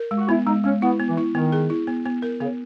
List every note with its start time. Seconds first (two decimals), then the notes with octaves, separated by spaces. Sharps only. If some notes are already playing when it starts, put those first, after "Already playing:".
Already playing: A#4
0.11 G#3
0.17 F#4
0.29 B3 E4
0.46 G#3 D#4
0.64 G#3 C#4
0.82 B3 E4
0.99 B3
1.08 E3
1.17 E4
1.35 D#3 B3
1.52 G#4
1.70 E4
1.87 B3
2.05 B3
2.22 A#4
2.40 C#3 B3